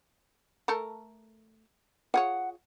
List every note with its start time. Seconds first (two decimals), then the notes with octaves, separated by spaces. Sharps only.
0.68 A3 A4 A#4
2.14 F4 G#4 C#5 F#5